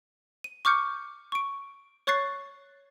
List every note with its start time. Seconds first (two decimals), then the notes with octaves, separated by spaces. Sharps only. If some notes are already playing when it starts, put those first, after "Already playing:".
0.44 D#7
0.65 C#6 D6 F6 G6 C#7
1.32 C#6 D7
2.07 C#5 C#6 F#6 A6 C7